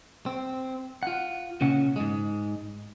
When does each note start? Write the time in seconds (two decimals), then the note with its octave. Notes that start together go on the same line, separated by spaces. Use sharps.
0.26 C4
1.03 F4 F#5
1.61 A#2 C#3 C#4 F#5
1.96 G#2 G#3